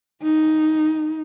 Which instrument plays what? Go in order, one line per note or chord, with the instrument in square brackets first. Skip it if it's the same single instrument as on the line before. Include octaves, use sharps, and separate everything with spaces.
[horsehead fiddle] D#4